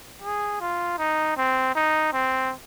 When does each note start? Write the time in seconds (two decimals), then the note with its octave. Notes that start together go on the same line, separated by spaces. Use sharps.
0.22 G#4
0.61 F4
0.98 D#4
1.37 C4
1.75 D#4
2.13 C4